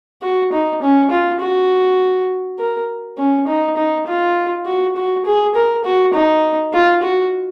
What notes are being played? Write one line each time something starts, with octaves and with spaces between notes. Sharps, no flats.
F#4
D#4
C#4
F4
F#4
A#4
C#4
D#4
D#4
F4
F#4
F#4
G#4
A#4
F#4
D#4
F4
F#4